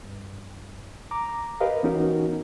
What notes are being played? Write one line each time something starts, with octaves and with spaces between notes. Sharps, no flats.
G2
A#5 D6
G4 A#4 B4 D#5 F5
E3 B3 C#4 D#4 F#4 A#4